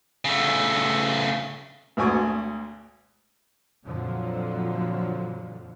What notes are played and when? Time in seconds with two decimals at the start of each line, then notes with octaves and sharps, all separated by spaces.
0.25 C#3 A3
1.97 G#1 D2 B2 G#5 C#6
3.85 F2 A#2 D3 F3 F#3